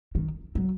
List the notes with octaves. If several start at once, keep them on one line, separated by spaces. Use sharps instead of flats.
D#3
F#3